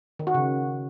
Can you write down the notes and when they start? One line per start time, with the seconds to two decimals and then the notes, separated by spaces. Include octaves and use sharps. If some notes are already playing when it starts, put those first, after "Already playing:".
0.19 D#3
0.27 F#4
0.34 C#3